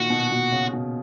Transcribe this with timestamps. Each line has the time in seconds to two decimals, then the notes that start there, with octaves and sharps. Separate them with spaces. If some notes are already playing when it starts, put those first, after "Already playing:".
Already playing: A#2 D#3 F#4
0.10 B2
0.32 B2
0.52 C#3
0.73 B2